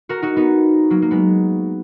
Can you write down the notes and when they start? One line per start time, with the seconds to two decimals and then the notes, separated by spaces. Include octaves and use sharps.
0.09 F#4 A#4
0.22 D#4 F#4
0.36 B3 D#4
0.90 F#3 A#3
1.02 A#3
1.11 G#3 B3